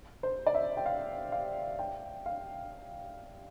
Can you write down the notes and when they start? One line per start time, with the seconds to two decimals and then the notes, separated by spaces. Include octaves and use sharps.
0.23 C5
0.46 D5
0.54 E5
0.77 G5
0.86 F5
1.32 F5
1.79 G5
2.26 F5